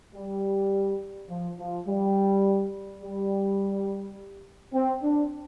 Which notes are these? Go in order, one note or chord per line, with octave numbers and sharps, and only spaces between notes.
G3
F3
F3
G3
G3
C4
D4